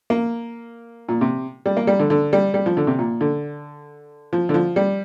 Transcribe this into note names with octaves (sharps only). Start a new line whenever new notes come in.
A#3
A#2
C3
G3
A#3
G3
D3
D3
G3
G3
F3
D3
C3
A#2
D3
F3
D3
F3
G3